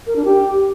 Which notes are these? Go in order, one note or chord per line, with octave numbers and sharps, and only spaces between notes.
A#4
D4
G4